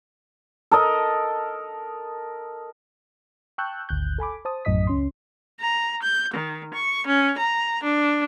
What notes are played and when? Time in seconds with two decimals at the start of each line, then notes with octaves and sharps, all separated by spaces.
0.71 A4 A#4 D#5
3.58 G5 A5 C#6 E6 F#6 G6
3.89 G#1 D2 F#6 G6
4.18 A4 G#5 B5 D6
4.45 C5 A5 D#6
4.65 A#1 F#2 A2 D#5 D#6 B6
4.87 C#2 C#4 C6
5.60 A#5
6.02 G6
6.33 D#3
6.73 C#6
7.05 C#4
7.38 A#5
7.83 D4